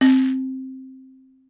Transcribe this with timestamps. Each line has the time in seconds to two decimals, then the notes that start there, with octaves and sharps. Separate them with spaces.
0.01 C4